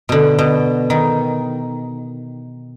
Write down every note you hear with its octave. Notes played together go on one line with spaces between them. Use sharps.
B2 D3
B2
D#3